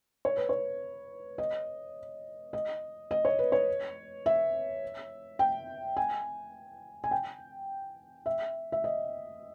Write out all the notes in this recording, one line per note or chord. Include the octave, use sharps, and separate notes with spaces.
C#5
B4
C#5
D#5
D#5
D#5
C#5
B4
C#5
E5
G5
G#5
G#5
G5
E5
E5
D#5